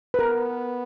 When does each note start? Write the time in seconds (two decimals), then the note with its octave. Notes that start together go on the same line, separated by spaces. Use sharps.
0.14 B4
0.19 B3 A#4